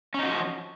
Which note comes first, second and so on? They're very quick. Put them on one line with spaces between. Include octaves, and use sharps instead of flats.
C#4 D#4 F#4 F3